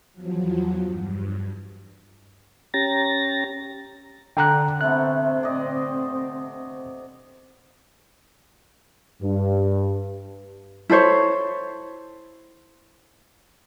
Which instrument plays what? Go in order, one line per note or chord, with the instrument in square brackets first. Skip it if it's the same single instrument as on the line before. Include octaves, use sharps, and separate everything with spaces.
[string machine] E2 F3 F#3
G2
[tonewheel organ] C#4 G4 A#5 A6 A#6
[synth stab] D3 [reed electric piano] G5 A#5 F#6
[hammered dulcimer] C3 A3 B3 [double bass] C4 [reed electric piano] F#6
[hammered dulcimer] D5 D#5
[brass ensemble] G2
[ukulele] E4 A4 C5 C#5